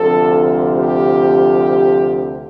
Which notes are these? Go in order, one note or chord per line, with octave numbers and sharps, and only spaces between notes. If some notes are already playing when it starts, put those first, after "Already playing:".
Already playing: D2 C3 F3 A4
G4